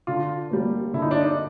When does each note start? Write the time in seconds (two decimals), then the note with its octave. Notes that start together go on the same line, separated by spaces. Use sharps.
0.07 D3 F4
0.51 G3 A#3
0.93 D3 E4
1.02 D#4
1.11 D4
1.21 D#4